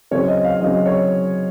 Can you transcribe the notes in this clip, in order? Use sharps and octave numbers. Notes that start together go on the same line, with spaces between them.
C#3 F#3 C4 C#5
D#5
F5
C#3 F#3 C4 D#5
C#5